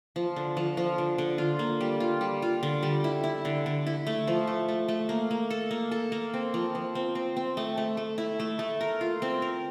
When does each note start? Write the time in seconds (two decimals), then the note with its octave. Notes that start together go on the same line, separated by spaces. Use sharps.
0.16 F3
0.36 D3
0.57 F3
0.77 F3
0.98 D3
1.18 D3
1.38 F4
1.59 A#3
1.81 G3
2.00 F4
2.21 G3
2.42 F4
2.63 D3
2.83 G3
3.04 E4
3.24 E4
3.45 D3
3.66 D3
3.86 E4
4.07 A3
4.27 F3
4.47 A3
4.68 A3
4.88 A3
5.09 A#3
5.31 A#3
5.50 A4
5.71 A#3
5.91 A4
6.12 A#3
6.34 C4
6.54 F3
6.75 F3
6.95 C4
7.15 C4
7.36 C4
7.57 A3
7.77 A3
7.97 A3
8.18 E4
8.40 A3
8.59 A3
8.81 A#4
9.01 F4
9.22 C4
9.42 A#4